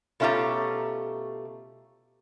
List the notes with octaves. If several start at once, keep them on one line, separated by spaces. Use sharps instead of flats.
B2 A3 C#4 F4 G4 A#5